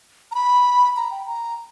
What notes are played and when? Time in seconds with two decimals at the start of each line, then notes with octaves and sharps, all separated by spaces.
0.31 A#5
0.35 B5
0.97 A#5
1.11 G5
1.27 A#5